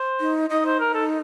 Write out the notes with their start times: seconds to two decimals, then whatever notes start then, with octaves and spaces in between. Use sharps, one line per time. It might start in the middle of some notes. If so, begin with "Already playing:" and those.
Already playing: C5
0.20 D#4
0.50 D#4 D#5
0.65 C5
0.79 A#4
0.94 A4